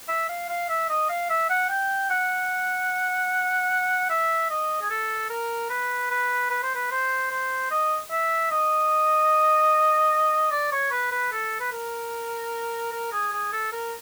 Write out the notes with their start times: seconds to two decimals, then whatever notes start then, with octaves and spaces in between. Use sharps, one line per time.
0.08 E5
0.29 F5
0.49 F5
0.69 E5
0.89 D#5
1.09 F5
1.30 E5
1.50 F#5
1.69 G5
2.10 F#5
4.10 E5
4.50 D#5
4.82 G#4
4.90 A4
5.30 A#4
5.70 B4
6.11 B4
6.50 B4
6.63 C5
6.75 B4
6.91 C5
7.31 C5
7.71 D#5
8.11 E5
8.51 D#5
10.51 D5
10.72 C#5
10.92 B4
11.11 B4
11.32 A4
11.60 B4
11.72 A#4
12.92 A#4
13.12 G#4
13.33 G#4
13.53 A4
13.72 A#4